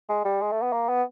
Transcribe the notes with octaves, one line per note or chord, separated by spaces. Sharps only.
G#3
G3
G#3
A3
B3
A#3
B3